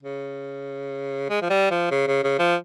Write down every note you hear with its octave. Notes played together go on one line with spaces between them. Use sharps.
C#3
G#3
F3
G3
F3
C#3
C#3
C#3
F3